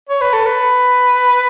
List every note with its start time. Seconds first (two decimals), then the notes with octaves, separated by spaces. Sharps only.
0.09 C#5
0.21 B4
0.33 A4
0.46 B4